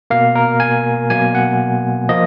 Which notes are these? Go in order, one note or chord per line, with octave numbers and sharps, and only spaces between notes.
B2 A#3 F5
A#4
G#5
B2 F#3 A#3 G#5
F#5
F3 A#3 D#5